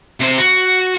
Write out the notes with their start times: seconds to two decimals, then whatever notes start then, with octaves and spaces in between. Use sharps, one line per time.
0.20 C3 C5
0.38 F#4